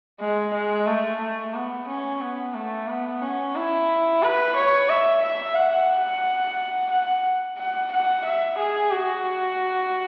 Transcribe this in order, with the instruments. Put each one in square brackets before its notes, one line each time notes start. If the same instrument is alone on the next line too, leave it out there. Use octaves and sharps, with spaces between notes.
[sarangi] G#3
G#3
A3
A3
B3
C#4
B3
A3
B3
C#4
E4
B4
C#5
E5
E5
F#5
F#5
F#5
F#5
E5
G#4
F#4